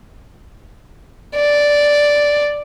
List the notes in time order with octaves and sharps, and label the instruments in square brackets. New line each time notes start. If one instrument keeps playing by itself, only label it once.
[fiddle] D5